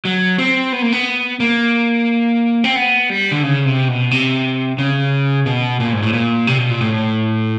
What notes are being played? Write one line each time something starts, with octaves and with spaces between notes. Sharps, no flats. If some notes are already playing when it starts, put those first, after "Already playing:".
F#3
C4
B3
A#3
B3
A#3
C4
B3
G3
D3
C#3
C3
B2
C3
C#3
B2
A#2
G#2
A2
A#2
C3
B2
A#2
A2